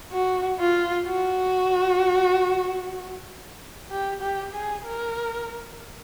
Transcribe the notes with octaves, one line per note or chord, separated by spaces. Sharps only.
F#4
F4
F#4
G4
G4
G#4
A#4